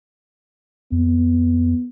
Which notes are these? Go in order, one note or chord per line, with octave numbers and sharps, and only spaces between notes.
F2 B3